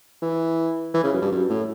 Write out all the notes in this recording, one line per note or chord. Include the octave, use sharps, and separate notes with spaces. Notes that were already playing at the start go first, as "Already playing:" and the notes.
E3
E3
C#3
F#2
G2
F#2
A2